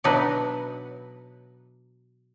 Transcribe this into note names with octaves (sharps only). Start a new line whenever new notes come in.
B2 E3 F#3 D4 D#4 B4